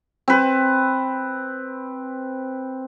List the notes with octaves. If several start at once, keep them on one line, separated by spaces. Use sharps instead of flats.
C4 B4